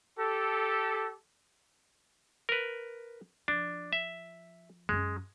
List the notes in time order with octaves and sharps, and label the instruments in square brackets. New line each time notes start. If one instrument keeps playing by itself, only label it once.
[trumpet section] G4 A4
[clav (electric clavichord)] A#4 B4
[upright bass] F3 [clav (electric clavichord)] D4
[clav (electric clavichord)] E5
[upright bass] F#2 C#4 [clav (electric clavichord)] G#3